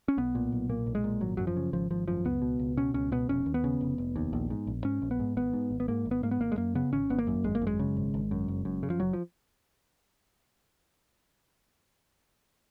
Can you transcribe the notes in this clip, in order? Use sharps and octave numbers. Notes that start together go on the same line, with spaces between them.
C#4
B1 B3
A#2
B1
A#2 A#3
B1
G#3
A#2
G#1 F#3
F#2 F#3
F3
C#3
G#1 F3
G#1 F3
F#2 F3
C#2 B3
B2
C#2
B2 C#4
C#2 C#4
B2 B3
F1 C#4
D#2
B3
C#3
F1
F1
D#2
A#1
G#2
A#1
G#2 C#4
A#1
B3
G#2
G#1 B3
G#2
G#1
B3
G#2 A#3
G#1
B3
G#2 A#3
B3
G#1 A#3
G#3
F#2 A#3
C#3 B3
G#1 C#4
G#1 B3
A#3
F#2
G#1 G#3
A#3
F#2
G#3
C#3
G#1
G#1
F#2
F#1
F#2
C#3
F3
F#1 F#3
F3